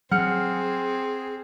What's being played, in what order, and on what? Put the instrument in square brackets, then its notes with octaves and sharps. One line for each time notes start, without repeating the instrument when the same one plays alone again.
[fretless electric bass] F#3 [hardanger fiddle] C4 [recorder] G#4 [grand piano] F#5 F6 C#7